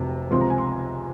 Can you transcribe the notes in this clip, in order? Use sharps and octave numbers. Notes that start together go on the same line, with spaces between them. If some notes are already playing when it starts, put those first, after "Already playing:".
Already playing: F1 F2 C3 F#3
C#2 C3 F3 C4 C6
A#5
G#5
C6